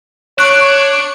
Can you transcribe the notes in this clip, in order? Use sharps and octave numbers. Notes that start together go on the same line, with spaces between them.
D4 C#5 C#6 F#6